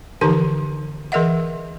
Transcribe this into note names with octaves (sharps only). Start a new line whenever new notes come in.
D3 E3 F3 D#4 G4 A5
E3 G#4 A#4 D#5 E5 F#5